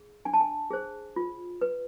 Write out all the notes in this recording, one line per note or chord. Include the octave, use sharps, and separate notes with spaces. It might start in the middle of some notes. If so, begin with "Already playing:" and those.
Already playing: G#4
D4 G#5
A5
G#5
G#4 C5
F4
B4